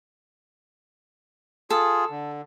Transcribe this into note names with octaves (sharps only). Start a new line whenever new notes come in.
F4 G#4 A4
D3